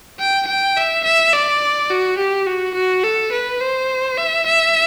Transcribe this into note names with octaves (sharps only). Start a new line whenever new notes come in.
G5
G5
E5
E5
D5
F#4
G4
F#4
F#4
A4
B4
C5
E5
E5